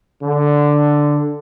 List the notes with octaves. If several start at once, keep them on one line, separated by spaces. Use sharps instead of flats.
D3